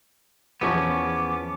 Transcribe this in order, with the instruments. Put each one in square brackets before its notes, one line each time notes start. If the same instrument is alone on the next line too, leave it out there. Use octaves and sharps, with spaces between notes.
[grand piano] E2 F3 C#6 [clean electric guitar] B3 C#4 [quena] D6